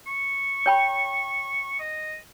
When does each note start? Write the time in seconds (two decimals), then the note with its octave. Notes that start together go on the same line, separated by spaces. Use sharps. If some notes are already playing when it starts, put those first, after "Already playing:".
0.07 C#6
0.66 C#5 G5 B5
1.79 D#5